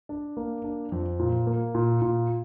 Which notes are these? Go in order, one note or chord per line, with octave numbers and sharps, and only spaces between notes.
D4
A#3
D4
F2
A#2
A#3
A#2
A#2